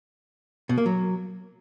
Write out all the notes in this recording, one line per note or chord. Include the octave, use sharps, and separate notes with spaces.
B2
A#3
F#3